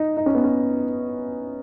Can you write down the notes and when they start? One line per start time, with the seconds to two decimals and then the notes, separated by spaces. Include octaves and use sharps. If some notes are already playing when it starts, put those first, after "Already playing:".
Already playing: D#4
0.17 D#4
0.26 C#4
0.35 B3
0.44 C#4